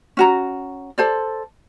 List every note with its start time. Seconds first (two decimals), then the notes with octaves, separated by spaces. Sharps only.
0.17 C#4 F#4 A#5
0.98 A4 C5 D5